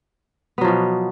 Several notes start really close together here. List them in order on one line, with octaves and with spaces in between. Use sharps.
B3 F#3 F3 B2